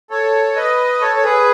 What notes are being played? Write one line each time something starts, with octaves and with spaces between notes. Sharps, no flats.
A4 C#5
B4 D#5
A4 C#5
C#5
G#4 B4